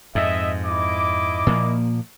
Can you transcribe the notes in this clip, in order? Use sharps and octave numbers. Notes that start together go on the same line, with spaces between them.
F2 G#2 D#5 E5
E4 D#5 D6
A#2 F3 A#3